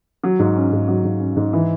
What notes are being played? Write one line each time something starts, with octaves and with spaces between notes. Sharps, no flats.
F#3
G#2
C#4
G#2
F#3
G#2
C#4
G#2
E3